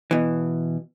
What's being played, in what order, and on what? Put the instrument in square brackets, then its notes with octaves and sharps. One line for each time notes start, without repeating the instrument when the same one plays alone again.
[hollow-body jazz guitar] B2 E3